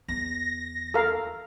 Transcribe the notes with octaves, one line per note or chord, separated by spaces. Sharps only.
E2 A#6
A4 A#4 F5